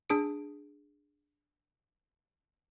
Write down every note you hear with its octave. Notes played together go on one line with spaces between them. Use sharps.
D4 G#4 D7